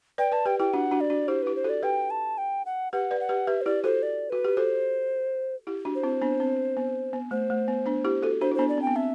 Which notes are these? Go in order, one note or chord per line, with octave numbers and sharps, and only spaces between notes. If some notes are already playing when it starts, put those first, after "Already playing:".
B4 D5 G5
B4 D5 A5
G4 B4 G5
E4 G4 G5
D4 F#4 F#5
D4 F#4
D5
D4 F#4
E4 G4 C5
E4 G4 B4
C5
F#4 A4 D5
G4 B4 G5
A5
G5
F#5
G4 B4 F#5
B4 D5
F#5
G4 B4
G4 B4 E5
C5
E4 G4 D5
F#4 A4 C5
D5
F#4 B4
G4
F#4 A4 C5
E4 G4
D4 F#4
C5
C4 E4
B3 D4
C4
B3
B3
A3 C5
A3
B3
B3 D4
E4 G4
F#4 A4
D4 F#4 C5
E4
B3 D4 C5
D5
C4 G5
B3
C4 E5